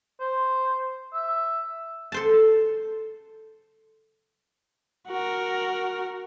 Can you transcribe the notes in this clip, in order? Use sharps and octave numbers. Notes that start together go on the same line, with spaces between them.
C5
E5
A4 C5 A5
F#4 A#4